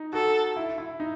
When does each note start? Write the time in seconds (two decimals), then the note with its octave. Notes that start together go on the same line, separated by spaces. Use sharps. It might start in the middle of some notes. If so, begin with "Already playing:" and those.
Already playing: D#4
0.13 F#4 A4
0.56 E4
0.78 E4
1.00 D#4